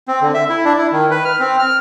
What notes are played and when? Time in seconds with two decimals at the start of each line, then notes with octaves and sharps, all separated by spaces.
0.08 C4
0.22 D3
0.34 E5
0.50 E4
0.65 D4
0.78 E4
0.92 D#3
1.11 B4
1.25 F6
1.40 C4
1.59 F6